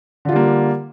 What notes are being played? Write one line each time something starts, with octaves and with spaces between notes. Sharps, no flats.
D3 G3 A#3 F4